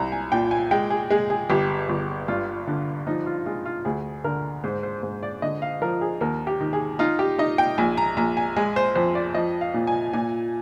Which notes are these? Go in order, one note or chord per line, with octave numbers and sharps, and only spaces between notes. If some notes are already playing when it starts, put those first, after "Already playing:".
Already playing: C2 A#5
G#5
A#2 G5
G#5
G#3 G5
G#4
G#3 G#4
G#4
G1 G4
G1
G2 F4
D3
F3 D#4
F4
G#3 F4
F4
D2 G#4
D3 A#4
G#2 C5
C5
G#2
D5
D3 D#5
F5
F3 A#4
G#4
D#2 A#4
G4
D#3
G#4
D#4 F4
G4
D#4 D#5
G5
A#1 G#5
A#5
A#1 A#5
G#5
G#3 G#5
C5
F2 C5
D5
F3 D#5
F5
A#2
G#5
A#2 G#5